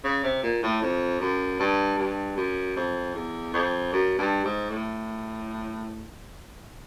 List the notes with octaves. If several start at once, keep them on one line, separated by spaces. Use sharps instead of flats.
C#3
C3
A#2
A2
F2
F#2
G2
G2
F#2
F2
E2
F2
F#2
G2
G#2
A2